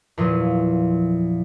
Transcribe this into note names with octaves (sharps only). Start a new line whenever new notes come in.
E2 A#2 F3 F#3